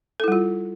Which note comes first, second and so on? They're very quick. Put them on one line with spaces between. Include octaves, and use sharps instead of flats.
A4 E4 G3 F4